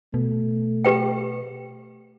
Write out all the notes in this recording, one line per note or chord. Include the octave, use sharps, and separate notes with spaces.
B2 A3
G4 B4 G5